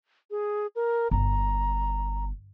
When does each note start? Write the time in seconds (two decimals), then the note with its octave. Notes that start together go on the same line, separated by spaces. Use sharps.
0.31 G#4
0.76 A#4
1.11 G1 A#5